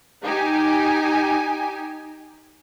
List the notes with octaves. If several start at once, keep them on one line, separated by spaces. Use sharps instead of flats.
D#4 G4 G#5